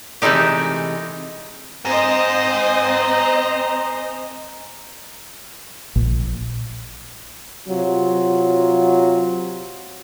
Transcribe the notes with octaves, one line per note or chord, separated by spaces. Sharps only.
C3 E3 G#3 A3 D#4 G4
C4 C5 D#5 G#5 A#5
A#1
C3 F#3 F4